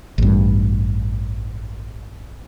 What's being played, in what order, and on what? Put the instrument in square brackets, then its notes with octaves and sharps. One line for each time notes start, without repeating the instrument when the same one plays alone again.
[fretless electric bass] A1 G2